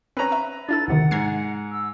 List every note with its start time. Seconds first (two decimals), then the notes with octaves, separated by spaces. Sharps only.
0.17 C4 C#4 B4 A#5
0.32 E5
0.69 D4 E4 A4 A6
0.88 D2 C3 D#3 F#5
1.11 G#2 A#5 G#6 C7
1.72 E6